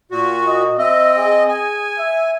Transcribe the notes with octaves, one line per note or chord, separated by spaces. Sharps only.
A#2 F#4
D#5
C4 D#5 E5
G#4
G#5
E5